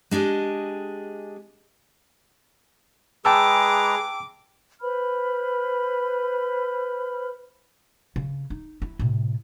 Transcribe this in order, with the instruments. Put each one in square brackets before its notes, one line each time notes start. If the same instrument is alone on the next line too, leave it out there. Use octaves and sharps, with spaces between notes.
[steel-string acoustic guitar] G#3 D4 G4 G#4 D#5
[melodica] G#3 B4 A#5 [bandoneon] G#4 [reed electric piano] G5 A5 E6 [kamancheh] D6
[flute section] B4 C5 B5 F6
[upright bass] C#3
D#4
E4
A2 C3